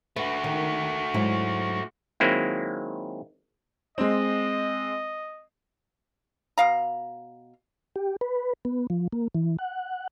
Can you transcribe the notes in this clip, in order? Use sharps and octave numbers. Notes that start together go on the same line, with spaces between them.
A3 F#4 B4
D#3
G#2 F#3 E4
D#3 F#3 G#3 A#3 C4 E4
G#3 C4 D#5
B2 F5 A#5
G4
B4
B3
F3
A#3
E3
F#5